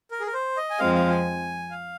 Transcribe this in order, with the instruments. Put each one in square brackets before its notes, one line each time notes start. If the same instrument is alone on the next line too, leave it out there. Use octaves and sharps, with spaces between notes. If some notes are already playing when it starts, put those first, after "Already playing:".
[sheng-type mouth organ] A#4
G#4
A#4
C5
D#5
G#5
[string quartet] F2 F3 G#3 C4 [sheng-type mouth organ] F5
[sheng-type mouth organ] F5
G#5
F5